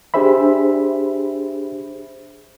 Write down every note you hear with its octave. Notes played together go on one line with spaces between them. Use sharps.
D4 G4 G#4 C5 E5 B5